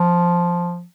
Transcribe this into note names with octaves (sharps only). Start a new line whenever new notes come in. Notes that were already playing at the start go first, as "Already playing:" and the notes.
Already playing: F3